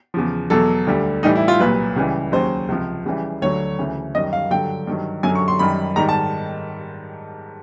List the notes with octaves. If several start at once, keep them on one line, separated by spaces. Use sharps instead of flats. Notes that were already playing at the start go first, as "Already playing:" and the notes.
E2 C#3 F3
E2 B2 F#3 A4
D2 D3 G3
A2 E3 G3 D#4
E4
F4
C2 A#2 F#3 B4
C#2 C#3 E3 G3
D#2 C#3 F#3 C5
C#2 C3 F3
C#2 C#3 E3 G3
D2 D3 F#3 C#5
D2 C#3 E3
F#2 D#3 G3 D#5
F5
G2 D3 F#3 G5
G2 D#3 F#3
F#2 D3 F#3 G#5
C#6
C6
F#2 D#3 G3 B5
G#2 D#3 G3 A#5
A5